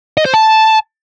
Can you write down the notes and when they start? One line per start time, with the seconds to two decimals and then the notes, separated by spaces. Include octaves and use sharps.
0.17 D#5
0.25 C5
0.34 A5